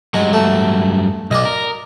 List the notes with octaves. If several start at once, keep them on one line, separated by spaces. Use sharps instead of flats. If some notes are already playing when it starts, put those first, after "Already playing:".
G2 F#3 G#3
A3
B1 D5 D#5
A#4